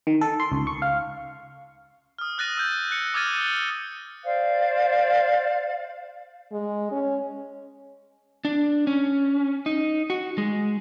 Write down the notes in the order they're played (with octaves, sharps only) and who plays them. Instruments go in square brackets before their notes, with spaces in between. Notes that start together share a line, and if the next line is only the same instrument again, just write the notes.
[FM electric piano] D#3
A4
C6
C#2
C#6
F5
[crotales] D#6 F6
D#6 F#6 A6 A#6 D#7
E6 G6
F#6 C#7
D6 D#6 F6 G#6 A6 D#7
D#6 G7
[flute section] C5 D5 F5
[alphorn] G#3
C#4
[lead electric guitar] D4
C#4
D#4
F#4
G#3